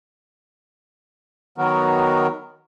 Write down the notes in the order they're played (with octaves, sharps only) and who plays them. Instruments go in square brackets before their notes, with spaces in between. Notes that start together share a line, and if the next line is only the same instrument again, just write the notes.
[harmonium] D#3 F#3 B3 F#4 A#4